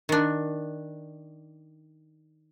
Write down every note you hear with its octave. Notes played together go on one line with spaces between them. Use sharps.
D#3 D4